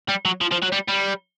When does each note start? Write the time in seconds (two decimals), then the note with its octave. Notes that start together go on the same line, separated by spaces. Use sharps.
0.09 G3
0.25 F#3
0.41 F3
0.51 F3
0.62 F#3
0.72 G3
0.88 G3